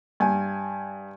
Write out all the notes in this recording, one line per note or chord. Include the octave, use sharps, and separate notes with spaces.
G2 G#5